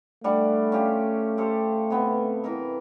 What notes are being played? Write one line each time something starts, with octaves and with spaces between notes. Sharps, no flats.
G3 A3 D4 F#5
C#4 F4 G4
G4 A4 C5
C3 B3
E3 A#4 E5